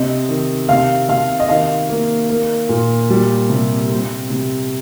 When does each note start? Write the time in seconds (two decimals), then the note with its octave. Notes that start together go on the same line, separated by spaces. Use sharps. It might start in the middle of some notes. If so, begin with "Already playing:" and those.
Already playing: C3 C4 D#5
0.29 D#3
0.69 C3 F5
1.09 C3 F5
1.40 D#5
1.49 D#3 F5
1.89 A#3
2.29 A#3
2.69 A#2
3.10 G3
3.50 C3
3.90 C4
4.30 C3